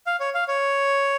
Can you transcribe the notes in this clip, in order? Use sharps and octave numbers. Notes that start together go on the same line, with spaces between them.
F5
C#5
F5
C#5